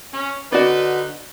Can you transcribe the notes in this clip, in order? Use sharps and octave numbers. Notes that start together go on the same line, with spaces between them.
C#4
D3 D#4 F#4 B4 D5